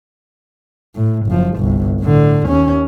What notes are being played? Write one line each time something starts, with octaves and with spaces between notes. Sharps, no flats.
A2
F#1 F3
G1 C2
A2 D3
D#2 C#4